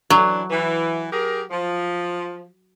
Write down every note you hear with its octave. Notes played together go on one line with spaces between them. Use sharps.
E3 F#3 D4
E3
G4 G#4 A#4
F3